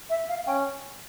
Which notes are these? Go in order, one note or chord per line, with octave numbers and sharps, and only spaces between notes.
E5
F5
C#4 G5